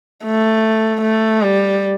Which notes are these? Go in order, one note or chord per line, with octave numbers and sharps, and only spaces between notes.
A3
A3
G3